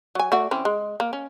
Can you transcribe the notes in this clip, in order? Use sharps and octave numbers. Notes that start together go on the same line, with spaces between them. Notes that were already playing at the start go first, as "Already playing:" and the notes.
F#3 G#5
A3 F#4 D5
E3 C4 C#4
G#3
A#3
C#4